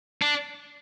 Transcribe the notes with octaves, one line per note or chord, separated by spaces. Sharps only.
D4